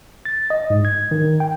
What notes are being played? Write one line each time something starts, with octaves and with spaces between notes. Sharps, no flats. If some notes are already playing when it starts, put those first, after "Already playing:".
A6
D#5
G#2
G#6
D#3
G5